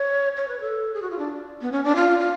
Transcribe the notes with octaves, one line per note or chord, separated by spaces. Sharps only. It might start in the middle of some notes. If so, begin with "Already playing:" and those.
Already playing: C#5
C#5
B4
A4
G#4
F#4
F4
D4
B3
C#4
D4
F4
F4